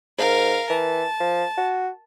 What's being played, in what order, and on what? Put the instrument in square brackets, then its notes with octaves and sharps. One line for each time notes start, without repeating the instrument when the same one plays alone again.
[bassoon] G#2 [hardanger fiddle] A#4 F5
[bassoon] E3 [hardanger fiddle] A5
[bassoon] F3
F#4